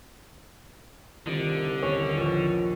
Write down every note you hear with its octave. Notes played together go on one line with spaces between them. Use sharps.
C2 D3 D#3 D#4 F4
D#2 C#4 E4 B4
A#1 F3 C#6